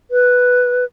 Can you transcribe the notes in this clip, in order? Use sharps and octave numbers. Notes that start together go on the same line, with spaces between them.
B4